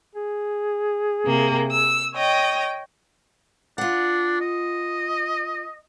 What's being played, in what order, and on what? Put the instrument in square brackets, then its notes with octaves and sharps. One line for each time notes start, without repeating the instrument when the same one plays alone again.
[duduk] G#4
[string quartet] C3 A#3
E6
C#5 D#5 G5
[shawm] D4 [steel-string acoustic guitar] F4 F#5
[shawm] D#5